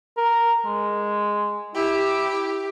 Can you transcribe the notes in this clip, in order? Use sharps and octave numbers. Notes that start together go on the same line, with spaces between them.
A#4
G#3
E4 G4